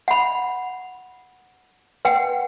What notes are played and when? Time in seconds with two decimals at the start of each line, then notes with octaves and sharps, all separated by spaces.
0.08 F#5 B5
2.05 B4 F#5 G5